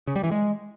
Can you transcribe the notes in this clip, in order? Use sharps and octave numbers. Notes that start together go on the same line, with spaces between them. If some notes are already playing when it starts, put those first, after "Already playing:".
C#3
G3
E3
G#3